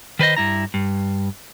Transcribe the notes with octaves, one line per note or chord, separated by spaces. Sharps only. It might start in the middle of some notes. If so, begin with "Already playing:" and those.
D#3 B4 C5 D#5
G2 E4 A#5
G2